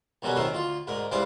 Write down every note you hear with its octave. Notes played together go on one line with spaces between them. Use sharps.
B1 F#2 B2 F#3 G3 G#5
F#2 A2 D#3 A3 A#4 C5
D2 F4
D2 G#2 A#4
C#2 E3 G3 C5 F5 D6